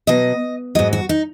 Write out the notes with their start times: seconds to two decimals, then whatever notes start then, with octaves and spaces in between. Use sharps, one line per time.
0.07 B2 F#3 D#5
0.75 G#2 F#3 D#5
0.93 F#4
1.09 D#4